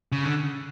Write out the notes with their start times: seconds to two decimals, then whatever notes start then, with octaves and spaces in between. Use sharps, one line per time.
0.12 C#3
0.24 D3